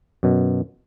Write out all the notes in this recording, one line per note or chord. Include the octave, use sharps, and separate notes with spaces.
F#2 B2